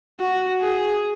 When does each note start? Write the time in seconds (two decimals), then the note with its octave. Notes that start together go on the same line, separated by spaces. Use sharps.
0.20 F#4
0.61 G#4